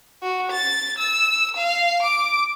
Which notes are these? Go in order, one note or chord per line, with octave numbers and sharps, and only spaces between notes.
F#4
A6
E6
F5
D6